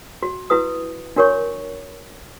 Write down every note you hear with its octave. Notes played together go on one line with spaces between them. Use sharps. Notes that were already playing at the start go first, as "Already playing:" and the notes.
F#4
E4 F#4 B4 D#6
D4 F#4 A#4 C#5 C#6